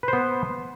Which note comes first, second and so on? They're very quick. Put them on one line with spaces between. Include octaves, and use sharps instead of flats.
B4 C5 B3